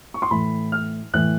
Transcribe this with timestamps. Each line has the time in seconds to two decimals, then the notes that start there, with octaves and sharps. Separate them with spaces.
0.14 C#6
0.22 C6
0.31 A2 E3 B5
0.72 F6
1.14 A2 E3 F#6